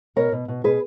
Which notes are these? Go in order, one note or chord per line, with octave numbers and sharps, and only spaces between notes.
B2 A#4 C#5
B2
B2
B2 G#4 B4